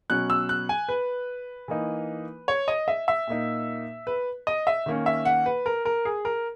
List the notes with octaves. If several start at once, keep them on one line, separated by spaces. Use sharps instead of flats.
B2 F#3 C#4 F#6
E6
F#6
G#5
B4
E3 A#3 D#4
C#5
D#5
E5
E5
A#2 A#3 D#4
B4
D#5
E5
D#3 A#3 C#4
E5
F#5
B4
A#4
A#4
G#4
A#4